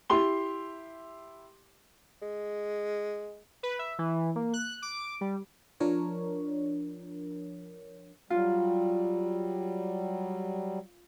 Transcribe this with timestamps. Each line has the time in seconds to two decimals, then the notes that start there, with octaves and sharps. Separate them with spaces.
0.10 E4 G4 C6 G7
2.22 G#3
3.63 B4
3.79 E5
3.99 E3
4.36 A#3
4.53 F#6
4.82 D6
5.21 G3
5.80 F3 D4 A#4 C#5
8.30 F#3 G3 F4